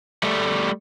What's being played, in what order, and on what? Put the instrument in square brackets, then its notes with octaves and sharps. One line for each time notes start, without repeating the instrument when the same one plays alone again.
[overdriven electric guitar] G3 A3